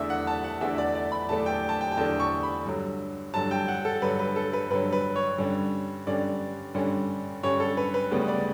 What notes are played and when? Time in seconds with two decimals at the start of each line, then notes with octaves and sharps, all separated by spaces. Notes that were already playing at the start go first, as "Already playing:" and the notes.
Already playing: E2 D3 A3 D4 E5
0.10 F#5
0.27 A5
0.44 F#5
0.61 E2 D3 A3 D4 E5
0.78 D5
0.95 D5
1.12 B5
1.29 E2 D3 A3 D4 A5
1.46 G5
1.69 A5
1.81 G5
1.92 G5
1.97 E2 D3 A3 D4 A5
2.20 C#6
2.43 B5
2.65 G2 D3 F#3
3.34 G2 D3 F#3 A5
3.51 G5
3.68 F#5
3.85 A4
4.02 G2 D3 F#3 B4
4.19 B4
4.36 A4
4.53 B4
4.70 G2 D3 F#3 B4
4.93 B4
5.16 C#5
5.38 G2 D3 G3 C#4
6.07 G2 D3 G3 C#4 D5
6.75 G2 D3 G3 C#4
7.43 G2 D3 G3 C#4 C#5
7.60 A4
7.77 B4
7.94 B4
8.11 D2 C#3 G3 B3
8.28 D5